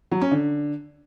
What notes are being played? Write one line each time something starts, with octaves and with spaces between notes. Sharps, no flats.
F#3
C#4
D3